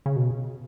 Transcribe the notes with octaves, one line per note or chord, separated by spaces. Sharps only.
C#3
B2